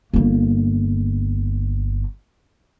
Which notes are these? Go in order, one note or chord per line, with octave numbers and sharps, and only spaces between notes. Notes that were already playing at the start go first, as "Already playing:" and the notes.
G1 A#3